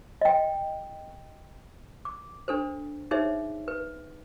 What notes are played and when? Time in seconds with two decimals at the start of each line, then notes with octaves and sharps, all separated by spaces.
0.21 D#5 G5
2.05 D6
2.48 D4 A4 C5
3.11 D#4 G#4 C5 C#5 E5
3.68 B4